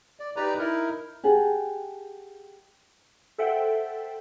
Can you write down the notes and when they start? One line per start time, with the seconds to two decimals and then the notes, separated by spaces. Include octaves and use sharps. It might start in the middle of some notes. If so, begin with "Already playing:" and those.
0.20 D5
0.36 D#4 G4 B4 D5 A#5
0.59 D#4 E4 A#4
1.23 G4 G#4 F#5 A5
3.38 A4 C5 E5 F#5 G5